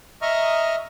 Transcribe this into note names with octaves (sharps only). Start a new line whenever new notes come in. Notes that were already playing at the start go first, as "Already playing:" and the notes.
D#5 E5 A#5 C#6 D#6 F6